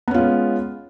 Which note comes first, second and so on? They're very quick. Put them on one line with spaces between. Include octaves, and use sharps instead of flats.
B3 C#4 F4 G#3